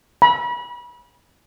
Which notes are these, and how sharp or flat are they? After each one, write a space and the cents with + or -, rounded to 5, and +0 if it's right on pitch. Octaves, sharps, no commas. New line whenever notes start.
B5 -30